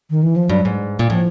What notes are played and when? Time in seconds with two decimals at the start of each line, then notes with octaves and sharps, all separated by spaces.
0.10 D#3
0.23 E3
0.36 F3
0.49 G2 F#3
0.65 G#2
0.99 A#2
1.10 A2 F3